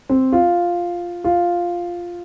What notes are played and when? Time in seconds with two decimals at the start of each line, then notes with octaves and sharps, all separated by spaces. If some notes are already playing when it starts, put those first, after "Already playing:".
0.09 C4
0.32 F4
1.24 F4